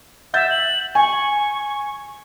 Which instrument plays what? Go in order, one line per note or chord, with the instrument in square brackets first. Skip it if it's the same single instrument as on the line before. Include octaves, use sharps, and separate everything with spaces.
[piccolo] E5 [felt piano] F#5 G6 A6
[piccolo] F#7
[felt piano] G#5 [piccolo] C#6